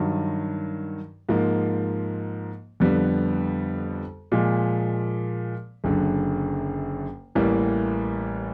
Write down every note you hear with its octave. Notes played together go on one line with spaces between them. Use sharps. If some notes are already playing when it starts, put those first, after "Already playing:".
Already playing: G2 D#3 F#3
G#2 F3 A#3
F2 D3 G3 B3
A#2 F3 G#3
F#1 F#2 D3
A1 A2 E3 G3 A#3